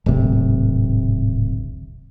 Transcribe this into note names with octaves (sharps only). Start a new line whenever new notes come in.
D1 G#1 C3